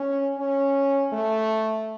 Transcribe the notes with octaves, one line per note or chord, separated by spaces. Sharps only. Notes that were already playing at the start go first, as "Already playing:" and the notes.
Already playing: C#4
C#4
A3